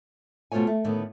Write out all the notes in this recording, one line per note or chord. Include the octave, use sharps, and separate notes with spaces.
B2 A3 F4 C5 C#5 G#5
A3
D#2 A2 D3 D#3 B3